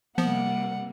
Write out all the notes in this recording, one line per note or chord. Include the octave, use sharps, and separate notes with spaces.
C3 F3 G3 A#3 B3 F#5